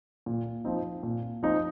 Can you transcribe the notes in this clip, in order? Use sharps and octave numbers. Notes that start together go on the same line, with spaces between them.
A#2
F3 C4 D#4
A#2
F3 C4 D#4